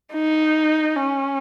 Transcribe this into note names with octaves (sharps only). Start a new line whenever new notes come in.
D#4
C#4